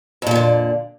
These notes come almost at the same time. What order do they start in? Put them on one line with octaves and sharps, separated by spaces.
F2 A#2 F3 D3